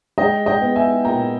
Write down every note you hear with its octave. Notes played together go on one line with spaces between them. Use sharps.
G#3 D#5 G5
D#5 G5
B3
E5 G#5
A#2 G5 A#5